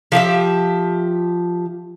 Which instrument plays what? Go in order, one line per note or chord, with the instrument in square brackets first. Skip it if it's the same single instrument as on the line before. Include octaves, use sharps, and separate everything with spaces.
[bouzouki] F3 G4 G#4 E5